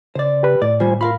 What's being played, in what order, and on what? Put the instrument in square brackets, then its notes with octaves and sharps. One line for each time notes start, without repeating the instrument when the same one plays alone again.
[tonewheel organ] C#3 [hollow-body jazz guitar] C5 D5
[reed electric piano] G4 B4 B5
[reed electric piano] A2 [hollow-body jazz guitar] D5
[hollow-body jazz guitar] D#2 G3 [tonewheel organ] F4 C5 G#5
[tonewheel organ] F4 C6 [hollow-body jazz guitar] A#4 F5 B5